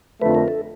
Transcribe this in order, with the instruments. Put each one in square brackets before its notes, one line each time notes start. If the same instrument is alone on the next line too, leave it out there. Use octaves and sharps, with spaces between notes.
[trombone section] F2 D3 F3 A3 [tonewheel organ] B4
[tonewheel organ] A#4
A4